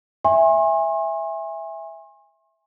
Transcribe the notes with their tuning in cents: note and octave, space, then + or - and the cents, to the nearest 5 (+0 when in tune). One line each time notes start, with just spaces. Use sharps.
E5 +0 G#5 -25 C6 +45